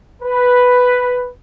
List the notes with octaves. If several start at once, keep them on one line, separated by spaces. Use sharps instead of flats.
B4